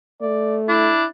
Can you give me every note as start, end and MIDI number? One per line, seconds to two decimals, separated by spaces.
0.21 0.91 57
0.21 0.59 74
0.68 1.04 62
0.68 1.07 64